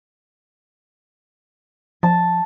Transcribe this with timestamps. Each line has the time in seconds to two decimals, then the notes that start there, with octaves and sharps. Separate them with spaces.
2.03 F3 A5